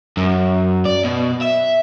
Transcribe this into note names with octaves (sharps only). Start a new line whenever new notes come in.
F#2
D5
B2
E5